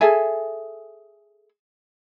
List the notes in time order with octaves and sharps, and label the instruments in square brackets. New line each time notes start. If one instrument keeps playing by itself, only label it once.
[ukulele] G#4 A4 E5 G#5